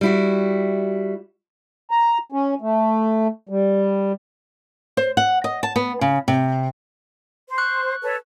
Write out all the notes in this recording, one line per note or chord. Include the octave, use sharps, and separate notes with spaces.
G3 E4 F#4
A#5
C#4
A3
G3
C5
F#5
D#5
A5
B3
C#3
C3
C5
C#6 F#6
A4 B4 C#5